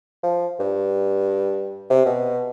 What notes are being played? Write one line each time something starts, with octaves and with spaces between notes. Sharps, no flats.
F3
G2
C3
B2